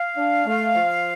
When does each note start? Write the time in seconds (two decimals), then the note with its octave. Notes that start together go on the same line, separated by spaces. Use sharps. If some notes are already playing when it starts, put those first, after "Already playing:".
Already playing: F5
0.16 D4
0.45 A3
0.74 F3